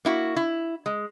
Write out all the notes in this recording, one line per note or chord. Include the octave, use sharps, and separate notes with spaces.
A#3 E4 F#4
E4
G#3